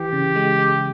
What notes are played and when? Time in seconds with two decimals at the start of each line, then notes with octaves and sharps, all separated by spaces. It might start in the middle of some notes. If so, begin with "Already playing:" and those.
Already playing: E3 G4
0.13 C#3
0.36 G#3
0.59 G#3